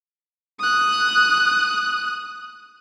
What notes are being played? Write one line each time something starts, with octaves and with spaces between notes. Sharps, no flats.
D#6 F#6